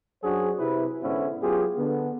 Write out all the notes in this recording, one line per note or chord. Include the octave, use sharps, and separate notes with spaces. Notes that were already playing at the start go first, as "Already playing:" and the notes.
F#2 F#3 D4 F#4 G#4 C5
C3 E4 B4
G#2 D3 B3 C#4 E4 C5
F#3 B3 F4 G4 G#4
D3 B3